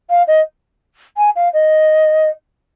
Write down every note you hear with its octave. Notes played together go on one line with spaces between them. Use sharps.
F5
D#5
G#5
F5
D#5